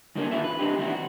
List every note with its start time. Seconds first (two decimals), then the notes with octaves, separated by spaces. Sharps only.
0.15 F#2 D3 D#3 F#3 A#3 C#4
0.31 D#4 F4 G4 G#4 B4 E5
0.44 B4
0.59 C4 D4 D#4 G4
0.78 D#3 G3 C4 E4 F#4
0.91 F#4